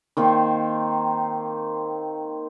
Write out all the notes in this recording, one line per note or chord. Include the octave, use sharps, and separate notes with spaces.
D#3 A#3 C4 C5